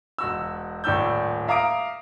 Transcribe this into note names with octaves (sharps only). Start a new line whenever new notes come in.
E1 F#4 E6
D#1 A2 D5 E6 G6
E5 F5 A#5 D6 D#6 D7